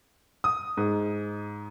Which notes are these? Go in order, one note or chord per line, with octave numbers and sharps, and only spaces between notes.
D#6
G#2